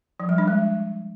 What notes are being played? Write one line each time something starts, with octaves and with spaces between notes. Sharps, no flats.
F3
G3
D4
G#3